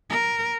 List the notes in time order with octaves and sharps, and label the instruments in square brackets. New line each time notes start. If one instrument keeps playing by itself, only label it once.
[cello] A#4